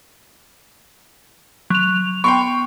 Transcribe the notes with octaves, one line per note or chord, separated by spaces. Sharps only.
F#3 F7
B3 G5 C6 C#6